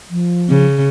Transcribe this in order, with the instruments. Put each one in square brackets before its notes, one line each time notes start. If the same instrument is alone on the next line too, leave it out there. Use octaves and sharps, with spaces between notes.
[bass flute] F3
[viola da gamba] C#3